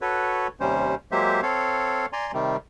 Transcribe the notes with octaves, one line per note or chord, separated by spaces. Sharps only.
F#4 A4 B4 C#5
D#2 C3 G3 C#4 C5
F#3 G#3 A#3 G4 C5 E5
C4 A4 C#5 F5
D5 G#5 A#5 C6
C3 D#3 G3